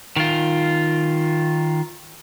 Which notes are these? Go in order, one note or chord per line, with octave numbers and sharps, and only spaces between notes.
D#3 F4